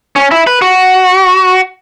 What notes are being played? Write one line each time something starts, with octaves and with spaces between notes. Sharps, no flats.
C#4
E4
B4
F#4